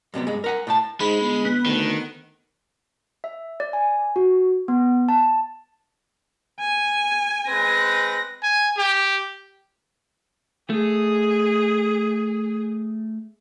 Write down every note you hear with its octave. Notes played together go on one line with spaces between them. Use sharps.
F#2 C3 G3 B3
G2 G#3
A#4 F#5 G#5
A2 G5 A5
G#2 G#3 B5
G1
B3
D2 D#3
E5
D5
G#5
F#4
B3
A5
G#5
G#3 C4 B4 A#6
G#5
G4
A3 G#4